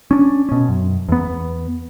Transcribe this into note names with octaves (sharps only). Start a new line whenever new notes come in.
C#4 D4
B2 C#4
F#2
E2 B3